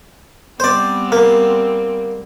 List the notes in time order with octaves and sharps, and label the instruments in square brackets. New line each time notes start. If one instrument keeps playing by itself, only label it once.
[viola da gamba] G3 B3 C4 [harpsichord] C5 D5
[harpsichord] A#3